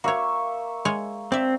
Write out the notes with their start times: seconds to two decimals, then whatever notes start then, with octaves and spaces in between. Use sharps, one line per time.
0.04 A#3 F#4 C#5 E5 C#6
0.85 G#3 C#5
1.32 C4 D5 E5